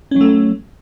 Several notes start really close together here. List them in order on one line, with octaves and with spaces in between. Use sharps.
C#4 F#3 A3